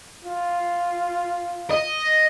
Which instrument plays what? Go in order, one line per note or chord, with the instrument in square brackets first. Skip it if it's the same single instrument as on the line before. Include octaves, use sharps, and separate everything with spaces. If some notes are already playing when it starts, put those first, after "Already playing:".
[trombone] F4
[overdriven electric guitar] D#5